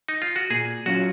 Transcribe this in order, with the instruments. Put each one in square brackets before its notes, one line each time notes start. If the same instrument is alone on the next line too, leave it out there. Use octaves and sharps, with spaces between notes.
[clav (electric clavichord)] D#4
F4
F#4
[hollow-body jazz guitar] A#2 [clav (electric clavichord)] G#4
[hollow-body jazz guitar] F#3 C#4 F4 [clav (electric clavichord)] F#4